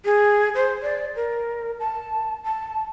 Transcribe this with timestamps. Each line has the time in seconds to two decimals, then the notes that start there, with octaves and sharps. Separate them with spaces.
0.05 G#4
0.55 C5
0.83 D5
1.16 A#4
1.80 A5
2.44 A5